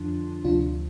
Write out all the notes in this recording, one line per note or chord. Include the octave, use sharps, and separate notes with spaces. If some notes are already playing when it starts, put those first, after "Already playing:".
Already playing: F2 D3 F3 D4 F4
D2 C3 F3 D4 F4